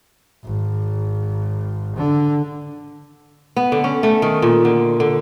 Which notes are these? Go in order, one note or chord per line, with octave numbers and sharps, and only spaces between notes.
G#1
D3
B3
D3
C#4
A3
D#3
A#2
D3
D3